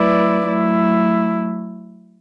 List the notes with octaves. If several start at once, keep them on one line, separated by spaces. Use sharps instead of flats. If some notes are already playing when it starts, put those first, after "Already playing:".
Already playing: F#3 A3 E4 B4 D5
F#3 A3 E4